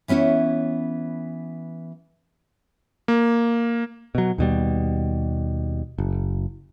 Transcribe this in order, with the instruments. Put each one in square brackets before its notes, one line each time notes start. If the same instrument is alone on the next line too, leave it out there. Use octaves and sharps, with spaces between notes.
[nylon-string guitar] E3 B3 C#4 E4 C#5
[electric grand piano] A#3
[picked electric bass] B2 F#3
D#2 B2 G3
F#1